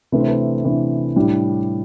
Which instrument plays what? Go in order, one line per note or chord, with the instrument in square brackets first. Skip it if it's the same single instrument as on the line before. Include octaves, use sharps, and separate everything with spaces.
[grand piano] C3 E3 A3 D4 B4
C5
B4
C3 E3 A3 D4
A2 G3 D4